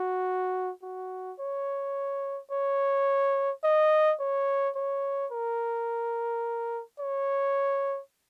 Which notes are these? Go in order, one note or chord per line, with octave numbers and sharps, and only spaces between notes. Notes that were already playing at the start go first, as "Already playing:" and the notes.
Already playing: F#4
F#4
C#5
C#5
D#5
C#5
C#5
A#4
C#5